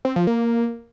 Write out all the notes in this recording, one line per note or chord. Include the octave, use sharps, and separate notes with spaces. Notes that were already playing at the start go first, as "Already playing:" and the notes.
C4
F3
A#3